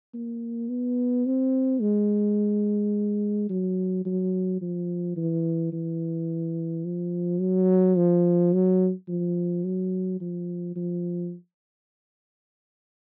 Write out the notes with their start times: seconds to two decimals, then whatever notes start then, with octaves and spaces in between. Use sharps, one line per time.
0.14 A#3
0.69 B3
1.26 C4
1.81 G#3
3.49 F#3
4.05 F#3
4.61 F3
5.16 E3
5.72 E3
6.85 F3
7.40 F#3
7.97 F3
8.53 F#3
9.08 F3
9.64 F#3
10.21 F3
10.76 F3